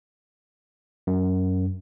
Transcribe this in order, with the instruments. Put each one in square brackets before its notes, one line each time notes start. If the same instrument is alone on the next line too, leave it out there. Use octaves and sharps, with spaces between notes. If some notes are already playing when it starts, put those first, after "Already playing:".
[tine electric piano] F#2